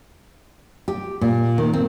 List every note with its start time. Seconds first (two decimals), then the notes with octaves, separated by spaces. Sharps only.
0.88 G4
1.21 A#2
1.58 D#3
1.73 C4